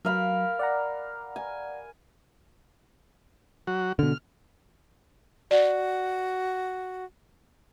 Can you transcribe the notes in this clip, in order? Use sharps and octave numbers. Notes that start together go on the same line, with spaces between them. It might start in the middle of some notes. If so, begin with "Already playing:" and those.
F#3 A#4 F5 B5
D5 F#5 A#5
G#5
F#3 F#4
B2 D3 F6
F#4 D5